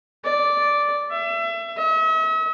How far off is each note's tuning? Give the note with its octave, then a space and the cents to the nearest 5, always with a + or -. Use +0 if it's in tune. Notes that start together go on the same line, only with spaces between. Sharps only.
D5 -5
E5 +30
E5 -45